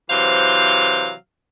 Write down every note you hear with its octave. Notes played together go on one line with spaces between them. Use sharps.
C3 E3 F#3 C5 F5